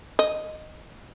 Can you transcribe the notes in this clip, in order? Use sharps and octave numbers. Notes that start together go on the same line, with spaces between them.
D#5